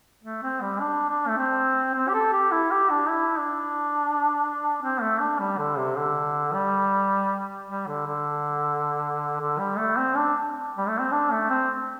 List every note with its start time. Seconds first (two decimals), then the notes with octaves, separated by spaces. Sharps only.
0.23 A3
0.43 C4
0.62 G3
0.80 D4
1.09 D4
1.28 A3
1.37 C4
1.95 C4
2.09 G4
2.14 A4
2.32 G4
2.52 E4
2.71 G4
2.90 D4
3.09 E4
3.39 D4
4.82 C4
5.01 A3
5.20 D4
5.39 G3
5.58 D3
5.77 C3
5.96 D3
6.53 G3
7.68 G3
7.87 D3
8.07 D3
9.40 D3
9.59 G3
9.78 A3
9.97 C4
10.16 D4
10.77 G3
10.88 A3
11.00 C4
11.11 D4
11.32 A3
11.49 C4